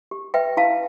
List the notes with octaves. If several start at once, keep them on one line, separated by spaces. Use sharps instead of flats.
G4
B4 E5 G5
E4 F5 A5